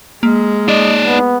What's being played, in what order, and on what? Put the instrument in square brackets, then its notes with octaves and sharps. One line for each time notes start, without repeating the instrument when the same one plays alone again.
[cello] G#3 [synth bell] A#3
[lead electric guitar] D#4 D5 [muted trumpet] D#5
[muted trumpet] B3